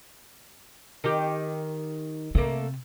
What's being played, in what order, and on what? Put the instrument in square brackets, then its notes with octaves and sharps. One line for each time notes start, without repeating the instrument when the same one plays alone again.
[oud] D#3 G4
[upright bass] C3 [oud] A3 A#3